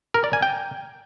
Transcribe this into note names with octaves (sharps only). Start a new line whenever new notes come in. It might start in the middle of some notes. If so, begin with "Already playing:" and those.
A#4
D5
G#5
G5